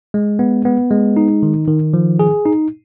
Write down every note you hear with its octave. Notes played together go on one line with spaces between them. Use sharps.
G#3
B3
B3
G#3
D#4
D#3
D#3
F3
G#4
D#4